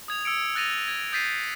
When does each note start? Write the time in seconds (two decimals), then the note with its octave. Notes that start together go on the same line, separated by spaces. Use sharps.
0.08 D#6 G#6 F7
0.25 E6 C#7 D7
0.55 F#6 A6 A#6 D#7 F7
0.88 G#6
1.12 D#6 G6 A6 B6 C7 D#7